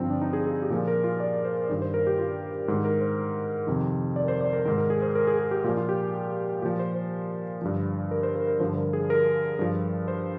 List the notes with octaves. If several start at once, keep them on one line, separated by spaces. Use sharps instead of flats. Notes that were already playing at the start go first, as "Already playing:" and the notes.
Already playing: G2 D3 F3 C4
D4
D#4
G#4
G#4
G4
A#2 F3 G#4
A#4
F4
D5
C5
G2 D#3 D5
C5
A#4
G4
F4
G#2 D#3 D4
A#4
C5
F2 C3 D#3
D5
A#4
C5
D5
A#4
G#2 D#3 A#4
A#4
G#4
C5
A#4
G#4
G#4
G4
A#2 F3 F4
F4
G4
A#2 F3 G4
C5
C5
G2 D3 F3
A#4
C5
A#4
A#4
G2 D3 F3 C5
A#4
G#4
A#4
G2 F3
C5